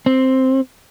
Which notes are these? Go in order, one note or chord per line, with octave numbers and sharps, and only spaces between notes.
C4